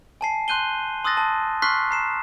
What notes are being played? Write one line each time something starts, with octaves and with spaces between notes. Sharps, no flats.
G#5 A5 C7
C6 F#6 G6 D#7 G7
C6 D#6 E6 F#6 A6 A#6
A5
C6 C#6 F6 F#6 B6 C7
A#5 C7 E7